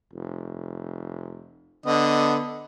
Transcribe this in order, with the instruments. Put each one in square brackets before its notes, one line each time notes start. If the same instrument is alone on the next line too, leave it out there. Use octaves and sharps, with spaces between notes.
[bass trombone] F1
[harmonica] D3 D#5 [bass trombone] B3